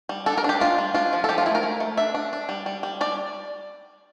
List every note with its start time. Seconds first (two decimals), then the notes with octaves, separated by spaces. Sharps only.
0.09 G3
0.26 D4 A4
0.37 A#4
0.44 D4 G4
0.60 D4 F4
0.78 G3
0.94 D4 F4
1.13 F3
1.24 A4
1.29 F3 G4
1.38 F4
1.46 A3 E4
1.55 A#4
1.63 A3
1.80 A3
1.97 D4 E5
2.14 D4
2.33 D4
2.49 G3
2.66 G3
2.83 G3
3.01 G3 D5